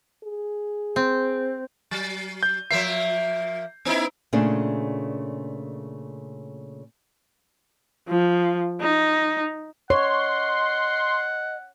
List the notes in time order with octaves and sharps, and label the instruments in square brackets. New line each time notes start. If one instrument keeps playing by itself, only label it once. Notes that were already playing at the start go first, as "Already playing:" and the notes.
[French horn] G#4
[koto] C4
[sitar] F#3
[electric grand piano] G6
[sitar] F3 A#3 E5 [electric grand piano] C7
[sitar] B3 D#4 E4
[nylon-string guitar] A#2 C#3 A3 C4 D4 G#4
[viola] F3
D#4
[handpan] C#5 [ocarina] D#5 [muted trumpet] F#5 [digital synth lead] C6